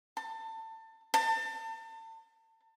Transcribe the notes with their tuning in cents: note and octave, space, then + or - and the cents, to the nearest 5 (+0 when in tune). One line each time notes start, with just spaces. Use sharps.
A5 +25
A5 +35